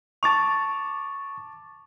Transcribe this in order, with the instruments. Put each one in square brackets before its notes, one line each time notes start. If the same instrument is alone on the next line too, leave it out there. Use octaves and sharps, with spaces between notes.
[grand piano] A5 D6 F7 [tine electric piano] C#6 A6